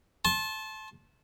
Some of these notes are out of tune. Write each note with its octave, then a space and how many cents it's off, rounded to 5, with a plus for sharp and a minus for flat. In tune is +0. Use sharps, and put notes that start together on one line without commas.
A5 -20 C6 +30